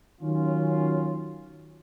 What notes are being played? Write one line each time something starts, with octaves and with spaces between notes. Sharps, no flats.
D#3 F#3 C#4 F4